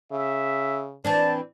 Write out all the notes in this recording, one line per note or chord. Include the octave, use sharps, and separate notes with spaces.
C#3 E5
E3 C4 D4 A5